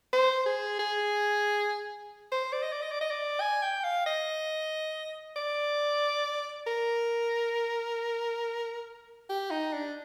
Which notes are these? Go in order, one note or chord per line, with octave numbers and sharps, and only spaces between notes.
C5
G#4
G#4
C5
D5
D#5
D5
D#5
D5
D#5
D5
G#5
G5
F5
D#5
D5
A#4
G4
D#4
D4